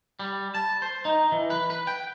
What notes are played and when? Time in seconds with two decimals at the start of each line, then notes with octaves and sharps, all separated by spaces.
0.20 G3
0.55 A5
0.82 C5
1.05 D#4
1.32 E3
1.50 B4
1.70 B4
1.87 G5